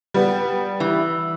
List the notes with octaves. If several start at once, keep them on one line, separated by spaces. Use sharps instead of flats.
G3 B3
E3